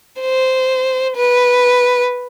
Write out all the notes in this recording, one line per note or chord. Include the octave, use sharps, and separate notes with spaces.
C5
B4